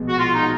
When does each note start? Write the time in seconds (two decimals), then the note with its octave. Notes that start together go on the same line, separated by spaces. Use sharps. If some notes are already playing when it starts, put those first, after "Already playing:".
Already playing: A#1 B2 G#3
0.09 F#4
0.18 G#3 F4
0.34 D#4
0.43 F#4